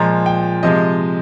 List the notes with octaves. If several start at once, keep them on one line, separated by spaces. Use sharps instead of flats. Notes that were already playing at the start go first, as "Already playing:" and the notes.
Already playing: A#2 F3 G#3 A#5
G5
C3 F3 G#3 D#5